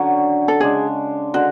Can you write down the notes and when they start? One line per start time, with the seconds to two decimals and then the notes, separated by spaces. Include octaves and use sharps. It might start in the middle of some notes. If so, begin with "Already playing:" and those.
Already playing: D3 F#3 C#4
0.48 A4
0.60 C#3 G#3 D4 G#4
1.34 D3 G#3 F#4